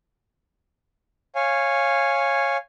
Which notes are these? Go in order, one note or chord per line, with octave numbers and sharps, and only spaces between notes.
C#5 F5 G#5